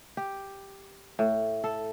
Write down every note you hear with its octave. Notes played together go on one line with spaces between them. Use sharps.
G4
A2
A4